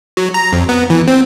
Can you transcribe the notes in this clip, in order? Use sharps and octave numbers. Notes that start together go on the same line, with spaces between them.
F#3
A#5
F2
B3
E3
C4